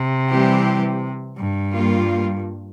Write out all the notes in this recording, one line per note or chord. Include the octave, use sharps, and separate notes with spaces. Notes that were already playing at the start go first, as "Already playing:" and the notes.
Already playing: C3
E3 G3 C4 G4
G2
G3 A#3 F4